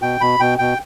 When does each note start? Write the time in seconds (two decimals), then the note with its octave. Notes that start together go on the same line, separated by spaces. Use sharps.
0.02 B2 G5
0.20 B2 B5
0.40 B2 G5
0.58 B2 G5